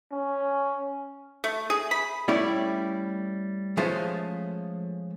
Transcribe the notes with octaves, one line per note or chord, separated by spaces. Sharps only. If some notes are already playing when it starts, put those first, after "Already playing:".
C#4
A3
G#4
B5
G3 A3 C#4 E4 C#5 D5
F3 G#3 A3 C#4 F4 C5